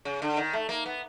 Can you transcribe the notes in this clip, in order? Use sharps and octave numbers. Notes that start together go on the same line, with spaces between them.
C#3
D3
D#3
A3
A#3
B3